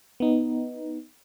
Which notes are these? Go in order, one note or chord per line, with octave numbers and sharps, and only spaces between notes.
B3 D#4